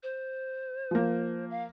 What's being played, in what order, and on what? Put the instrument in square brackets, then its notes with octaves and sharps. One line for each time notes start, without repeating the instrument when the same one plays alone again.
[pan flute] C5
[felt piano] F3 A#3
[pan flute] F5